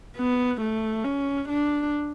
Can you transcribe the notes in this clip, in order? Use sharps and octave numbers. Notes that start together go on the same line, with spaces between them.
B3
A3
C#4
D4